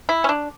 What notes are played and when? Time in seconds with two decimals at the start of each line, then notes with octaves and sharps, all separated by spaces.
0.09 E4
0.24 C#4
0.29 D4